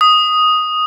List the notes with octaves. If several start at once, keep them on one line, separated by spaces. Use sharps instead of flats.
D#6